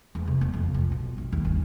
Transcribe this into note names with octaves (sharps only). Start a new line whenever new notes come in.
E2
C3
B3
F2
F3
B2
A#1
D#2
G1